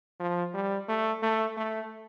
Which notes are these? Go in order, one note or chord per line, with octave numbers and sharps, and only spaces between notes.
F3
G3
A3
A3
A3